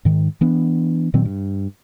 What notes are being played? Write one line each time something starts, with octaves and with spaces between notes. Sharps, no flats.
G#2 D#3
E3 B3 D4
A#2 D#3 F#3 C4
G2